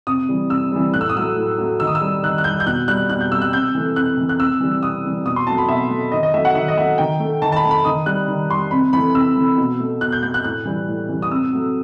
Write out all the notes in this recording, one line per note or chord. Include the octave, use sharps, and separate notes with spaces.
C3 D#6
E3 G3
C3 E6
E3 G3
A2 F#6
E6
D#6
F#3 A3 E6
A2
F#3 A3
D#3 E6
D#6
E6
G3
D#3 F#6
F#6
G3 G6
G6
B2 F#6
G3 F#6
B2 F#6
G6
G3 E6
F#6
C3 G6
E3 A3
C3 F#6
E3 A3
F#6
C3 E6
E3 G3
C3 D#6
E3 G3
B2 D#6
C6
F#3 A3 A5
B5
B2 E5
F#3 A3
D#3 D#5
D#5
F#3 A3 E5
F#5
D#3 E5
D#5
F#3 A3 E5
D#3 G5
A3
D#3 A5
A5
B5
A3
B5
D#3 D#6
G3 F#6
D#3
G3 C6
C3 B5
E3 A3 B5
C3 E6
E3 A3
B2
A3
B2 F#6
G6
A3 G6
F#6
A2 F#6
E3 G3
A2
E3 G3
D#6
C3 E6
F#3 A3